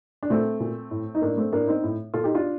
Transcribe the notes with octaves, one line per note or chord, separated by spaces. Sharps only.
D4
A#2 A3 C4
A#2
A2
D#4
A2 A#3 D4
A3 C4
A2 A#3 D4
C4 D#4
A2
A#2 F4 A4
D#4 G4
D4 F4